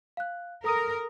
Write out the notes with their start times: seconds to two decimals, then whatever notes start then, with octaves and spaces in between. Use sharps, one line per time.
0.17 F5 F#6
0.64 A4 A#4 D#6 D#7